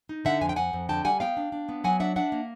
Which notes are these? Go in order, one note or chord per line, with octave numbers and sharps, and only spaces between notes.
D#4
D3 E5 F#5
F2 G#5
G5
F2 F#5 G#5
F2
D3 G5 A5
G3 F#5 G#5
B3 F5 G5
D4
D4
B3
F#3 F#5 G#5
D4 E5 F#5
D4 E5 F#5
A#3